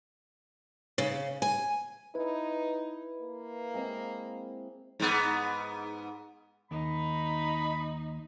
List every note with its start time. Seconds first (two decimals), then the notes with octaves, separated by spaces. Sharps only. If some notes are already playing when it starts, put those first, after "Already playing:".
0.98 C#3
1.42 G#5
2.15 D#4 E4 B4
3.21 A#3
3.74 G#3 C4
5.00 G#2 B3
6.71 D#2 D#4 B5